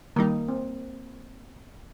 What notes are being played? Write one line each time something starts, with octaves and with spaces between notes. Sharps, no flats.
D#3 G3 A#3 D#4
C4